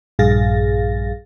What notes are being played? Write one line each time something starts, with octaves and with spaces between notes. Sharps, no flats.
A#1 G2 G#4 F5 A6 A#6